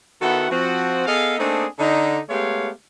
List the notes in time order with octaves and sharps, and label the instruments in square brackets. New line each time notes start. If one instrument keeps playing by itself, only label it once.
[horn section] D#3 B3 E4 F#4 A4 F#5
F3 C4 F#4
B3 G#4 A4 D#5 F5
A3 A#3 C4 D4 D#4 G#4
D3 D#4
G#3 A3 B3 G4 C#5 F5